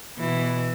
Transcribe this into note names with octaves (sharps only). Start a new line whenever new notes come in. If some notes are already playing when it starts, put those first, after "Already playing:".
B2 E3